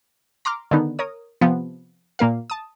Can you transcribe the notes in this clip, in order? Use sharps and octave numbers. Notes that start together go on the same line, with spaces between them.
A#5 C6 D6 F6
D3 D#3 B3 D#4
A#4 C#5 D#6
C3 F3 B3
A#2 A#3 A#4 F5
A5 D#6